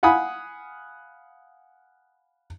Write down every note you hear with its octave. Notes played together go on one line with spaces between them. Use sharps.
F5 F#5 G#5 B5 D#6